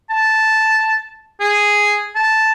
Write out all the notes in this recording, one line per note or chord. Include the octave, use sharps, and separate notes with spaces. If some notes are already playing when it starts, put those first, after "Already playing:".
A5
G#4
A5